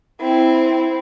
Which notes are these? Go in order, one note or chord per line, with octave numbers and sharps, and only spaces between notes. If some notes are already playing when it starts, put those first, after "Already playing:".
C4 E4